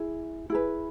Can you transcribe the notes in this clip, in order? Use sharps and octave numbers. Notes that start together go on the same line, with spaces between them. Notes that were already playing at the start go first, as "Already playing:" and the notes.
Already playing: E4 G#4
E4 G#4 B4